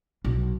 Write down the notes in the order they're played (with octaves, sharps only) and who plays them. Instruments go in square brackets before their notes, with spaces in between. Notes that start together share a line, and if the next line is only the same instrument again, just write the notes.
[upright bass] B1